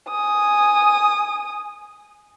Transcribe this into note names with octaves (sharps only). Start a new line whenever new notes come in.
G#5 D#6